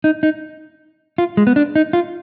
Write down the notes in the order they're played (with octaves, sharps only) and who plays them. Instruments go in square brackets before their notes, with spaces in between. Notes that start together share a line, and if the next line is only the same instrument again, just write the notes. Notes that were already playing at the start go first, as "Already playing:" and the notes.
[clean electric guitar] D#4
D#4
F4
G#3
B3
D4
D#4
F4